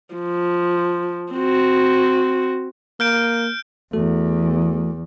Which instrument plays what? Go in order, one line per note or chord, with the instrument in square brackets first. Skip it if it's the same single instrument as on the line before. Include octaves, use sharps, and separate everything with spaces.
[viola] F3
C4 F#4
[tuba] A#3 [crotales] F6 G6 D7
[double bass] E2 [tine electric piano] A3 F#4 A4